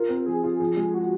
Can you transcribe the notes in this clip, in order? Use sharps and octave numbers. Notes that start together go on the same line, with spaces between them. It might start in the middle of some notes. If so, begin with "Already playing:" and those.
Already playing: F4 A#4
C4
F3 G#4
F4
F3
G#3
F#4